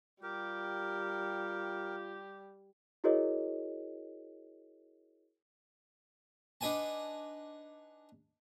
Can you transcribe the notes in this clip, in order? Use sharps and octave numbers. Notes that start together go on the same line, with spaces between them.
G3 F4 G4 A#4
E4 F#4 G#4 A#4 C#5 D#5
D4 D#4 B4 G#5 A5